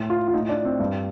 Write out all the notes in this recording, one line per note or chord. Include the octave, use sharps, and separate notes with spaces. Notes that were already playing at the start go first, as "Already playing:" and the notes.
Already playing: A2
F4
F4
A2 D#4
D4
C4
G2